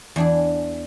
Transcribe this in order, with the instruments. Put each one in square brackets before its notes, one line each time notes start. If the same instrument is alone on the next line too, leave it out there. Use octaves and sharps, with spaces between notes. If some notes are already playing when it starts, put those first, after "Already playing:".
[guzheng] E2 D4 G#4